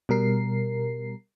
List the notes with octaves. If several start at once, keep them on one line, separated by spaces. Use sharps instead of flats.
B2 G3 A#4 C7